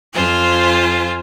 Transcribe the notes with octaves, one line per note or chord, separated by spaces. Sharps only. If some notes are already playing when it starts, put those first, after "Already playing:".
F2 F4 C5 G#5